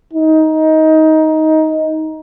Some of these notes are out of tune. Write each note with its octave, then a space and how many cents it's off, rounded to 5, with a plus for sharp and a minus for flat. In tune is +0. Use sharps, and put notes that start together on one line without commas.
D#4 +15